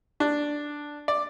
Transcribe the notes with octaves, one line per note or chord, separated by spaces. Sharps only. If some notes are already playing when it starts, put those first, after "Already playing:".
D4
D5